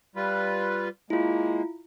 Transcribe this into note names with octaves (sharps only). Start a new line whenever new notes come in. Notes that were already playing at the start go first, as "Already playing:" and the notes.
G3 F4 B4
G#3 A#3 E4 F4